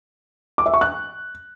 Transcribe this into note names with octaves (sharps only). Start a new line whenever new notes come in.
D6
E5
C#6
F#6